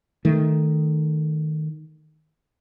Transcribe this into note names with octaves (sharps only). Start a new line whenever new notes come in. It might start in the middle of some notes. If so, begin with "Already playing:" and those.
D#3 A3